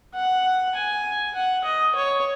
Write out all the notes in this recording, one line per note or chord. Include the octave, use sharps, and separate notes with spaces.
F#5
G#5
F#5
D#5
C#5